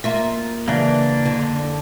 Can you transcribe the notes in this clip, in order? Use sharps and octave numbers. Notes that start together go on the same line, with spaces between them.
A#3 F4 E5
C#3 E3 A#3 D4
F2 D3